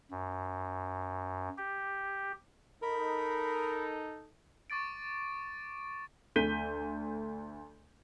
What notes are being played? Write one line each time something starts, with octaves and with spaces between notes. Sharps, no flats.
F#2
G4
D#4 A4 A#4 B5
C#6 D6 A6 D7
D2 A4 G6 B6 D#7 G7